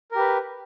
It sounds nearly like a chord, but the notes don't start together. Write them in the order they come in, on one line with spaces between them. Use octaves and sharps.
A#4 G4 B4